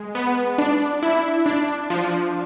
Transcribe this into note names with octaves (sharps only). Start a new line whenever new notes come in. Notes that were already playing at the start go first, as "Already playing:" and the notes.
Already playing: G#3
B3
D4
E4
D4
F3